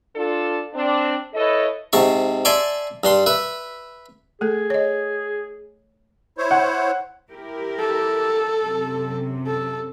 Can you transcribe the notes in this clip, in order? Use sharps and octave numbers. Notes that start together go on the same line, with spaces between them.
D4 F4 A4
C4 D4
E4 A4 B4 C#5 D#5
G#2 C3 A5 C#6
D5 E5 G#5 A5 C6 D6
G2 D4 C6
B4 E5
A3 G#4 A4
C#5 D#5
E4 C5 C#5
F#5
E4 G4 A#4
A4
F#2 C3
A4